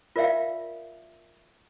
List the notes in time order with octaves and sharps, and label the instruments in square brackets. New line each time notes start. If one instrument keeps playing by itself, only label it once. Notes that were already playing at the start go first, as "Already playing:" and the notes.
[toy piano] F4 A#4 D5 E5 F5 G5